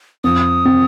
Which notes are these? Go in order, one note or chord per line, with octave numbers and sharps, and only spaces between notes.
F2 D#6
C4